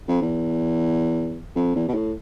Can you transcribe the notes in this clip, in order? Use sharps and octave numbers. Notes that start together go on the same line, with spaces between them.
F2
E2
F2
E2
B2
A2